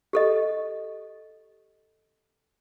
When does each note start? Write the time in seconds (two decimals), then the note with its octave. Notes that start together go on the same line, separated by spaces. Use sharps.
0.13 G4 A4 D#5